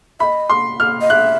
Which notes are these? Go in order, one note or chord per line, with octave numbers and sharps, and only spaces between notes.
D#5 E5 B5
C6
F6
D#5
E5 F#6